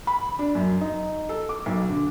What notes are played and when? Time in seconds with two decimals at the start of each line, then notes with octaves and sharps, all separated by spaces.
0.07 B5
0.39 D4
0.55 F#2
0.81 D#4
1.29 A4
1.49 D6
1.66 B1
1.89 D3